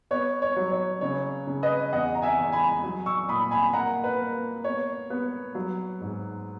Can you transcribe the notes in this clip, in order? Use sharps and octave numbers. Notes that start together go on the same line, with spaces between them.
B3 C#5
C#5
F#3
C#5
C#3 C#5
C#3
B4 D#5
E2 D#5 F#5
A#5
E5 G#5
E2
G#5 B5
F#3
C#6 E6
A#2 B5 D#6
G#5 B5
A#3 F#5 A#5
B4
A#3
B3 C#5
B3
F#3
G#2